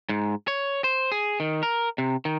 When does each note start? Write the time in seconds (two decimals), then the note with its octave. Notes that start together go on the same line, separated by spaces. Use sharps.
0.09 G#2
0.48 C#5
0.84 C5
1.12 G#4
1.40 D#3
1.63 A#4
1.98 C3
2.25 D#3